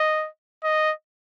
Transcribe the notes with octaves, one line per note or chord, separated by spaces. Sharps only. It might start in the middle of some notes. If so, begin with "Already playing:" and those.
Already playing: D#5
D#5